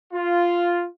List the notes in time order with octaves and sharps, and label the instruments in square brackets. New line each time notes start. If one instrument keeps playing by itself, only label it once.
[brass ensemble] F4